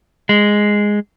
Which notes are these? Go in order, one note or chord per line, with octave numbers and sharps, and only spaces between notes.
G#3